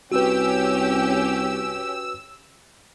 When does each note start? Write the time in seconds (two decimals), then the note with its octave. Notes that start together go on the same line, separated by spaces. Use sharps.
0.12 C2 C#4 F#4 G4 B4 E6